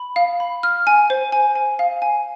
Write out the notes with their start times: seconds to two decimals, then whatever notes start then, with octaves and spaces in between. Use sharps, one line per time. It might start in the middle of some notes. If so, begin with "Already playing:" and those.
Already playing: B5
0.16 F5
0.40 B5
0.63 F6
0.87 G#5
1.10 C5
1.32 G#5
1.55 G#5
1.79 F5
2.02 G#5